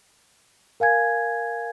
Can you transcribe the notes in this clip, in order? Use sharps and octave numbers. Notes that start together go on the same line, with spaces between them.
A#4 F5 G#5 G#6